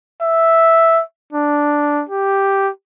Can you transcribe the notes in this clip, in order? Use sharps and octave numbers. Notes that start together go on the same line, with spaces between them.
E5
D4
G4